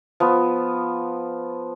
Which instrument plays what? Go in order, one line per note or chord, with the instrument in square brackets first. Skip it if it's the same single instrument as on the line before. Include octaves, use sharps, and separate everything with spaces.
[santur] F3 B3